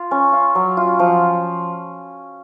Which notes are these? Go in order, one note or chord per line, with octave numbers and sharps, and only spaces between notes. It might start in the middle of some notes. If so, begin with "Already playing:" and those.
Already playing: F4
C#4
F4
F#3
F4
F3